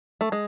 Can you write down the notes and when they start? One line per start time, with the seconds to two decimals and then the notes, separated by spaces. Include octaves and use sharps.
0.21 A3
0.32 G#3